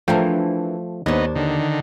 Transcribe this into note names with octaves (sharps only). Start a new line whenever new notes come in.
E3 F3 A3 D4 A#4 G5
D#2 B3 D4 D#4 C#5
D3 D#3